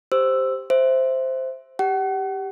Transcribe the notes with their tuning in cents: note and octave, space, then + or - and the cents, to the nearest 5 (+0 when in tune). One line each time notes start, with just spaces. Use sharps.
G4 +0 C5 +0 E6 +5
C5 +0 E5 +0
G4 +0 F#5 +35